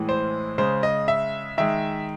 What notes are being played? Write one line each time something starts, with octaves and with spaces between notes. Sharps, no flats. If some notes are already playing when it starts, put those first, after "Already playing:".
Already playing: A2 E3 G#3
C5
C#3 G#3 C5
D#5
E5
D#3 G#3 E5